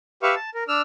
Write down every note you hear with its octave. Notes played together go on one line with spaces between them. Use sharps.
G4 B4 E5 F5 C#6
A5
A#4
D4 E6 F6